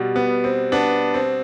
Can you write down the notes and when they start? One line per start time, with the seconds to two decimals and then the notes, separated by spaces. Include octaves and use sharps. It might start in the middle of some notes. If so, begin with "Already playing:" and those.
Already playing: B2 G3
0.16 B3
0.44 C4
0.72 B3 D4
1.14 C4